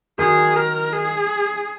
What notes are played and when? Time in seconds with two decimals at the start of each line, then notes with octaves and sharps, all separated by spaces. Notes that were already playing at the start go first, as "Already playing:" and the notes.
0.18 D#3 F#3 G#4
0.56 A#4
0.93 G#4